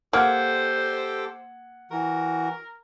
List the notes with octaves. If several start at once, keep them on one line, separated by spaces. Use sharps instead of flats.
A#3 G4 A4 C5 F#5 G5 G#6
E3 F#4 A#4